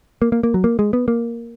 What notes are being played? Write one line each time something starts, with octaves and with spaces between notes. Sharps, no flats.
A#3
A#3
A#3
F#3
A#3
G#3
B3
A#3